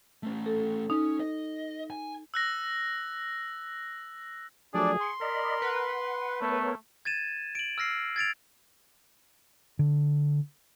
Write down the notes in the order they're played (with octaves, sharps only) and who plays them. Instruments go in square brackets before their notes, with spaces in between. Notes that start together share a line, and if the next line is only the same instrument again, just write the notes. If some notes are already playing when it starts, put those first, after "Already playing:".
[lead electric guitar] A3 C#4
[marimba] A4
[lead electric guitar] C#4 [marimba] D#4
[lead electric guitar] D#5
G#5
[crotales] E6 F#6 A#6
[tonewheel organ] F3 F#3 A3 [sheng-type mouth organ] D4 D5 [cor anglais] G#4
[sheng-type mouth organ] C6 [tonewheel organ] C#6
[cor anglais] A#4 [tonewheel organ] D5 D#5 B5
[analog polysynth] B4 [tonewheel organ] F#5
[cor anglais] A3 [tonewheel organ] B3 A#4 C#5
[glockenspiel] G#6 A6 D#7 E7
D7 F#7
E6 F6 A#6 C7
G#6 A6 D7 F7
[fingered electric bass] D3